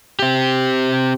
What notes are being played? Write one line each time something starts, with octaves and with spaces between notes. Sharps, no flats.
C4 G4